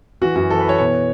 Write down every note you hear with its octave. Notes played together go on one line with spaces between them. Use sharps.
E3 F#4
F#2 F#4
E3 A4
B4
E3 C#5
B2 C#5